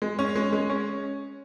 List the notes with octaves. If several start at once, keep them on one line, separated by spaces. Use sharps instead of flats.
G#3
C#4
G#3
G#3
C#4